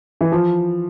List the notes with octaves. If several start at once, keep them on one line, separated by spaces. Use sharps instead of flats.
E3
F3